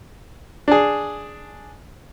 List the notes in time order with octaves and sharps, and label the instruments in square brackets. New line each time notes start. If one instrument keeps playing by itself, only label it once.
[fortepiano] D4 G#4